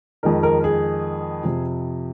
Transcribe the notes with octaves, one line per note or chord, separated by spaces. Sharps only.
F2 D#3 G#3 A#4
A#4
G#4
F2 C3 F3